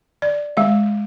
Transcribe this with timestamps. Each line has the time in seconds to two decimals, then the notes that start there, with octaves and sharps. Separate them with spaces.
0.22 D5
0.57 G#3 F5